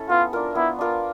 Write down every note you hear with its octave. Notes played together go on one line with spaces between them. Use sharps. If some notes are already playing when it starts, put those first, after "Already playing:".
Already playing: C#4 E4 A4
B3 F4
D4 F4 A#4
B3 E4
D4 F4 A#4